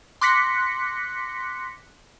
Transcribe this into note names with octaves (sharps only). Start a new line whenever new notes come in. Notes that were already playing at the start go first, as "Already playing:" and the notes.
C6 D6 F#6 A#6 B6 C#7